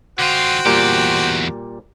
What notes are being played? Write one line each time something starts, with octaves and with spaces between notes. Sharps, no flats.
D3 F4 F#4 C5 G5
E2 A#2 G3 G4